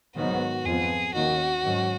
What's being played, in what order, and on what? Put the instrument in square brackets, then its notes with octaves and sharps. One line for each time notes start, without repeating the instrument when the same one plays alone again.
[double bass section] G#2 D#3 F#3 B3 [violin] F#4
[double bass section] F2 F3 B3 [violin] G#4
[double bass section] D#2 D#3 A#3 C#4 [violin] F#4
[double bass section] G#2 D#3 F#3 C#4